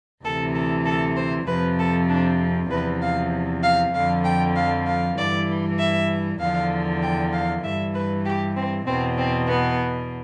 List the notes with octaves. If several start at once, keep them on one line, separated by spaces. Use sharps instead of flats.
D2 C3 E3 A4
A4
A4
C5
F2 C3 F3 B4
A4
D4
E2 C3 F3 B4
F5
F5
F2 D3 F3 F5
G5
F5
F5
G2 E3 D5
E5
E2 D3 F3 F5
G5
F5
G2 E3 E5
B4
G4
C4
E2 B2 C4
C4
B3